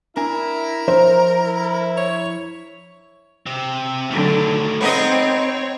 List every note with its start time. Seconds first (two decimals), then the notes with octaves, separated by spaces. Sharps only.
0.17 D4 E4 A#4 G#5
0.88 F3 D4 C5 E5
1.34 E4
1.97 C#5
3.46 C3 C4
4.11 D3 D#3 F#3 A3
4.81 B3 C4 D#4 C#5 D#5